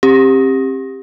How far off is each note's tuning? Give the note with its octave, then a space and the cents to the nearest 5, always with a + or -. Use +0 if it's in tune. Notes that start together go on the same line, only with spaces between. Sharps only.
C4 +35 G4 +15